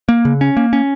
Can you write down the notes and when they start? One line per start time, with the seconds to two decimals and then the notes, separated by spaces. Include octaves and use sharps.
0.09 A#3
0.25 C#3
0.41 C#4
0.57 A#3
0.73 C#4